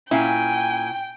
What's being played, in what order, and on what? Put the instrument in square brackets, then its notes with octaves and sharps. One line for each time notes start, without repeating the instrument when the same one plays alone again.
[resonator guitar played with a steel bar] A#2 C#4 F5 [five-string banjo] E4 [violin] G5 [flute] G#5